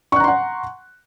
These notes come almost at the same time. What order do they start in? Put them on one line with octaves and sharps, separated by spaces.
C#6 F#6 A#5 C6 F#5